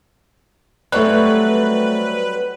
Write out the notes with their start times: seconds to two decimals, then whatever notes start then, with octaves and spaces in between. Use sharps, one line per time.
0.92 F#3 G3 A3 C4 B4 C#6 F#6